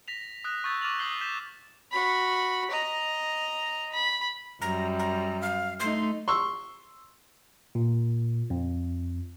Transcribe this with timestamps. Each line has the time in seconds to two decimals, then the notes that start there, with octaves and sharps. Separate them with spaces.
0.08 A#6 B6 F7
0.44 D#6 F#6 A#6
0.64 C#6 D#6 E6 G6 A6 B6
0.81 C#6 D6 F6 A6 F7 F#7
0.99 D#6 F#6 G6 C7 F#7 G7
1.21 G6 B6 E7
1.91 F#4 B5
2.71 D#5 A#5
3.92 B5
4.62 F#2 G3 A#5
4.99 A#5
5.41 F5
5.80 A3 D#4 C6
6.28 C6 C#6 E6
7.75 A#2
8.50 F2